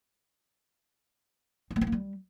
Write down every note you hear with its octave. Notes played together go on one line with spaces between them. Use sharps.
C4
A3
C4
A#3
G3